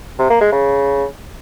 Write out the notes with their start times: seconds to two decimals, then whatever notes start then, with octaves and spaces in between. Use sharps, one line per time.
0.19 C3
0.30 A#3
0.41 G#3
0.52 C#3